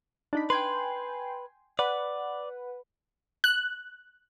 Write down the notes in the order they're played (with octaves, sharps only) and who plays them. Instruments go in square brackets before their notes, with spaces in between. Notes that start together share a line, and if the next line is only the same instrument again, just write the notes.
[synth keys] D4 D#4 B5
[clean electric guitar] B4 [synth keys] G5 G#5 C6
[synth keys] B4 F#5 [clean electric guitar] D5
[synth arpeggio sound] F#6